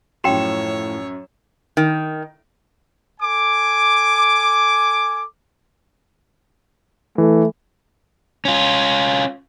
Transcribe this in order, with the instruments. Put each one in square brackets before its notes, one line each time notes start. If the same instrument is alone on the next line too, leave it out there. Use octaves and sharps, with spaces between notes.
[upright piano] F#2 E7 [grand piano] A2 F3 [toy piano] F#4 G5 [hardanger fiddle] C#5
[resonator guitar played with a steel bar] D#3
[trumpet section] A4 G#5 D6
[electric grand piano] E3 [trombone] A3
[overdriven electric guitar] C#4 F4